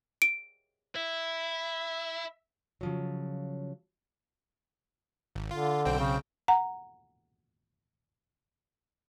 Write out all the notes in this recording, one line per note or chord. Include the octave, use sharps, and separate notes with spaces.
D7
E4 E5
C#3 F3 F#3
G#1
D3 F4
B1 C4 G5
C#3
F#5 A#5